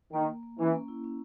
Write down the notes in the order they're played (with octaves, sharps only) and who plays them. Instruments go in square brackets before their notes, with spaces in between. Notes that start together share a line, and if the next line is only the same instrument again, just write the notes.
[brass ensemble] D#3 [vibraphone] A#3
[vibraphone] A#3
A#3
[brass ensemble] E3 [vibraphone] C#4
[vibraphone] A#3
E4
C#4